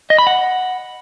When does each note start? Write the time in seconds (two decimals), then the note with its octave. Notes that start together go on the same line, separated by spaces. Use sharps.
0.10 D#5
0.18 B5
0.27 F#5